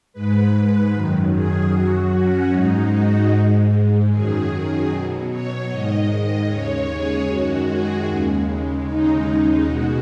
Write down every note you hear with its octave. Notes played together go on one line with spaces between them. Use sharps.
G#2 G#3 B4
F#2 D#3 F#3
G#4
F#2 F#3 F#4
C#4
G#2 G#3 D#4
F#4
G#2 G#3
F#2 D#3 F#3 G#4
B2 F#3
C#5
G#2 D#3 G#3 D#5
D#5
D#2 C#3 G#3 C#5
G#4
F#2 D#3 G#3 F#4
G#4
D#2 C#3 G#3
D#2 C#3 G#3 D#4
B2 G#3 F#4